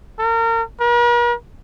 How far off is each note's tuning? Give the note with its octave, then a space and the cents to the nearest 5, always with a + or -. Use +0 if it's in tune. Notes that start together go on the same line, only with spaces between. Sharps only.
A#4 -30
A#4 +45